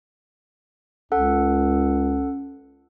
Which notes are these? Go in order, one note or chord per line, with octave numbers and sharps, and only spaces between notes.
C#2 C#4 A4 F#5